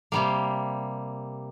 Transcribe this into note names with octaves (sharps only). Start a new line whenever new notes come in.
C3 G3 A#3